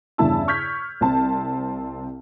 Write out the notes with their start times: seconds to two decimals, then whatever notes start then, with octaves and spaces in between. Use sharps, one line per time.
0.18 E2 G2 C#3 E4 A5 E6
0.48 C#6 F6 G6 G#6 B6
1.01 C2 C4 A5